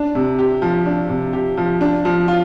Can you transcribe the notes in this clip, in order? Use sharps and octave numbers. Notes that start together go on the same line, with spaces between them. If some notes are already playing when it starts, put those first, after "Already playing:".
Already playing: D4
C3
G4
F3
D4
C3
G4
F3
D4
F3
F4